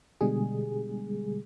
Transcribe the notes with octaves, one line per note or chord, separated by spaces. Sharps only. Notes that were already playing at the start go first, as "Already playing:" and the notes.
B2 D3 G3 G#3 G#4